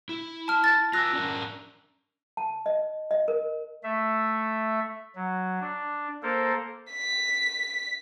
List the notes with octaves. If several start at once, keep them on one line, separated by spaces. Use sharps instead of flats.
E4
A5 F6
A6
F4 G#5 E6 F#6 A#6
C#4 D4 A#4
A5
D#5
D#5
A#4
A3 E5
F#3
D4
A#3 A4 A#4 C5
B6